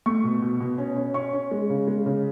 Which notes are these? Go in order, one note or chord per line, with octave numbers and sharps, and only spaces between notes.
A3 C#6
B2
B2
B2
C#4
C#4
C#4 C#6
C#4
G#3
C#3
G#3
C#3